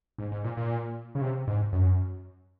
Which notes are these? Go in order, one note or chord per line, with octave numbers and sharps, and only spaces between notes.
G#2
G#2
A#2
A#2
C#3
C3
G#2
F#2